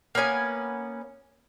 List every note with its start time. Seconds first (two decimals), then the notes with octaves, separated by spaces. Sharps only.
0.15 A#3 B3 C#4 G#5